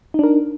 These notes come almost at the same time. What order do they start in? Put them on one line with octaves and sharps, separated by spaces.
D#4 D4 A#4